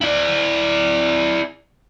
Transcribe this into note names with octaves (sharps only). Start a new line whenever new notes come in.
E4 D5